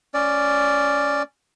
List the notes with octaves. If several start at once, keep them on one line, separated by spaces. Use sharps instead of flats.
C#4 D5